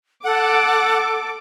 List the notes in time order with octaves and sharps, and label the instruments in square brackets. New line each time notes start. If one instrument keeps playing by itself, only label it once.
[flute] A4 [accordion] F#5 [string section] D6